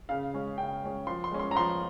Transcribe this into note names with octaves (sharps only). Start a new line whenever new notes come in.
C#3 F5
G#3 C#4
C#3 G5
G#3 C#4
F3 C6
C6
G#3 C#4
C6
A#5
F3 C6